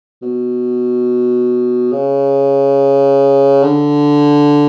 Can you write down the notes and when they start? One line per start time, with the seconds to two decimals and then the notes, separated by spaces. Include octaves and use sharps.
0.22 B2
1.92 C#3
3.63 D3